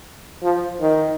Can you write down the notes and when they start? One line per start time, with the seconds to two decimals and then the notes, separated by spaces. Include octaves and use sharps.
0.42 F3
0.81 D#3